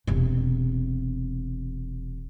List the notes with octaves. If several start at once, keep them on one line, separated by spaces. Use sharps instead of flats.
E1 C3